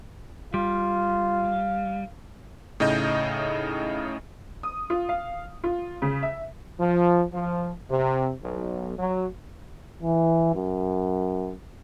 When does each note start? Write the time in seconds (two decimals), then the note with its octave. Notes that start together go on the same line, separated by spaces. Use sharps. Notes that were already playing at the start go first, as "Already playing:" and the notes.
0.54 G3 F4 F5
2.80 A2 C#3 D#4 D#5 G6
4.63 D#6
4.90 F4
5.09 F5
5.64 F4
6.02 C#3
6.23 E5
6.79 F3
7.33 F3
7.90 C3
8.42 B1
8.98 F#3
10.02 E3
10.55 F#2